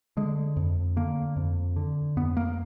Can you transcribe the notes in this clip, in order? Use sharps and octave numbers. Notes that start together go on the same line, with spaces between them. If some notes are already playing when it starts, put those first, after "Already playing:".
D3 G#3
F2
D3 A#3
F2
D3
F2 B3
A#3